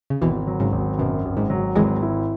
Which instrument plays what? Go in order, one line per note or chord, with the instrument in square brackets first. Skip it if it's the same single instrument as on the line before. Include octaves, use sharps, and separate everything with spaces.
[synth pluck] C#3
[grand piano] G#1 [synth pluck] B2 E3
[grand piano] F#3
[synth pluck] G#2 C#3
[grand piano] G#1
[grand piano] F#2 [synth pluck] B2
[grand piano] G#1
[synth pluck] G#2
[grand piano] F#3
[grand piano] G#1 [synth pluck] E3 G#3
[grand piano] E4